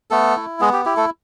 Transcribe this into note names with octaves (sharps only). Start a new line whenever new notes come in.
A3 B3 A4
E4
G#3 B3 G#4
G4
E4 G4
A3 A4